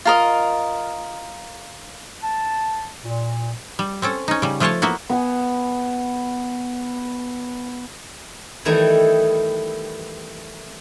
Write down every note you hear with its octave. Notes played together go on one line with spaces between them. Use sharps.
F4 A#4 D#5
A5
A#2
G3
C4 C#4 A4
C#4 D#4
C#3 G3
F3 A3 F4 C5 C#5 A5
A#3 B3 E4 F#4
B3 G#5
D#3 E3 G3 A3 D#4 E4